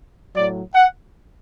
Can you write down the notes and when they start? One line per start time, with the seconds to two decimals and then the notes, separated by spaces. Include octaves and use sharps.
0.35 A2 F#3 D5
0.74 F#5